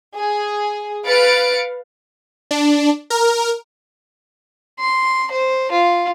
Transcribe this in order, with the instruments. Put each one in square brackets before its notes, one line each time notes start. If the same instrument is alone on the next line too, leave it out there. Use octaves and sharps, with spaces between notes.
[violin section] G#4
B4 F5 A6 C#7 D7
[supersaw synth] D4
A#4
[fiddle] C6
C5
F4